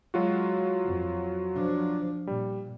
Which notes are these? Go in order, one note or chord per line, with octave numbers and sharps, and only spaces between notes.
F#3 G#3 F4 F#4
F2
F3 D4
A#2 G3